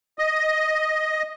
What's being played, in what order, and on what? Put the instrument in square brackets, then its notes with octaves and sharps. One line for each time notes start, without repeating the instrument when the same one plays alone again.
[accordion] D#5